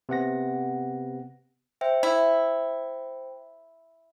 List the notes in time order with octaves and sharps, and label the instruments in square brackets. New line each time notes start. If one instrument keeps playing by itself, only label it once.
[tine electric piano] C3 B3 F#5 A#6
[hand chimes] C5 E5 G5
[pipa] E4